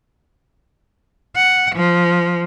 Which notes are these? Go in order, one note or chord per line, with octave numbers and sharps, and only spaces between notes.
F#5
F3